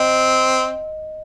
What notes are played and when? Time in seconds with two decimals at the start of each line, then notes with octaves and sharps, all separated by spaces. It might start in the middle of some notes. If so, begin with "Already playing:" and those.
Already playing: C4 D#5